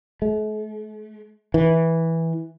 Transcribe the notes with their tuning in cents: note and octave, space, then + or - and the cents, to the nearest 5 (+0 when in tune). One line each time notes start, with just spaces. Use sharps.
A3 -45
E3 -10